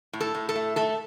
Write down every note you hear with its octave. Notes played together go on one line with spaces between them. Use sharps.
A2
A4
A2
A4
A3
A3 A4